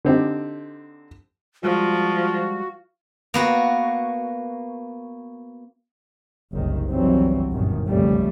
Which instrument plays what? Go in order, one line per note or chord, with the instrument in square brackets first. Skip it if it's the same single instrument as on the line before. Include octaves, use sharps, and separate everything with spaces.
[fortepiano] D3 C4 D#4 G4
[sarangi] F3 [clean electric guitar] G3 G#3 [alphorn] F4 [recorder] F#4
[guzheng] A#3 B3 F#4
[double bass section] F#1 C2 D#3
G1 C2 F2 E3 F#3 C4
G1 F#2 A#2 D#3
B1 F2 C#3 G3 A3